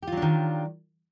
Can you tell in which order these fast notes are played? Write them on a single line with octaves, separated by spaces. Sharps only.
G4 F4 F#3 D4 D#3